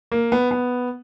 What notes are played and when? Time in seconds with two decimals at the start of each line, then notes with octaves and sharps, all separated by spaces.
0.12 A#3
0.32 B3
0.51 B3